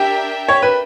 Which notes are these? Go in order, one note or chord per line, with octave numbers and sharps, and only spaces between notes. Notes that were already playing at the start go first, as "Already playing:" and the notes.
Already playing: D4 G4 A#4 E5 G5
C#5
B4